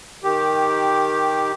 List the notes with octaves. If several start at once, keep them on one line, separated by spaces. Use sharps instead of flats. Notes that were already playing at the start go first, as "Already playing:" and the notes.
D#3 G4